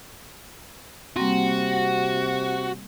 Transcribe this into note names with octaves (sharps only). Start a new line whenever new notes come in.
C3 G3 A#3 C4 F#4